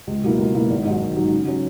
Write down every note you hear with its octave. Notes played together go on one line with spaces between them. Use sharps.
C#2
B2 F#3 A#3 E4
C#2
B2 F#3 A#3 E4
G#1
G#2 D#3 F#3
G#1
G#2 D#3 F#3
C#3
F#3 C#4